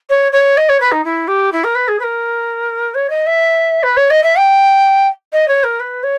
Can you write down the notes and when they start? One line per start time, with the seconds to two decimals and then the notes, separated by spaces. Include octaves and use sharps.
0.09 C#5
0.32 C#5
0.57 D#5
0.69 C#5
0.80 B4
0.91 D#4
1.04 E4
1.27 G4
1.52 E4
1.64 A#4
1.75 B4
1.88 G#4
1.99 B4
2.03 A#4
2.94 C#5
3.10 D#5
3.26 E5
3.83 B4
3.96 C#5
4.10 D#5
4.23 E5
4.37 G5
5.32 D#5
5.48 C#5
5.63 A#4
5.79 B4
6.03 C#5